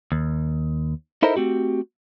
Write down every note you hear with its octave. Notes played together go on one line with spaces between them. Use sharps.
D#2
D#4 E4 A4 A#4 C5 D#5
A3 C4 F#4 G4